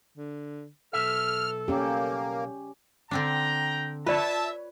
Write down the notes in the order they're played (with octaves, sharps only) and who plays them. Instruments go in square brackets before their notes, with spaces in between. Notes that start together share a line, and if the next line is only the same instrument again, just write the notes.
[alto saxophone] D3
[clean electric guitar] B1 A#2 E5 [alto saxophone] A4 [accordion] F6
[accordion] A#3 [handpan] C#4 G4
[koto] D3 C4 D4 [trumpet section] G5 A#5
[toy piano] F4 D5 [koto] B4 C#5 [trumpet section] E5 A5